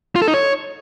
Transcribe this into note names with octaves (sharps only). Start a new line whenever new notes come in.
F4
A4
D#4
C#5